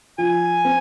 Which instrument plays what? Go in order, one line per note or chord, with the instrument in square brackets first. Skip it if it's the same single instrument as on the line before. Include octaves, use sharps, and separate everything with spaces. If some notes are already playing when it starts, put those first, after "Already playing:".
[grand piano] F3 [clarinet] G#5
[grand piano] C4